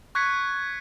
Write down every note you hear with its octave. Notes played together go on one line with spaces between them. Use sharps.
C#6 F#6 G#6 B6 C#7